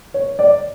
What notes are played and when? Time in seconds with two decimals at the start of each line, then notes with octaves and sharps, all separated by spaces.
0.14 C#5
0.39 D5